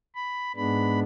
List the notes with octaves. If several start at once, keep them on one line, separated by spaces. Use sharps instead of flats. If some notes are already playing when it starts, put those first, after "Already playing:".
B5
G#2 G#3 B3 D4 B5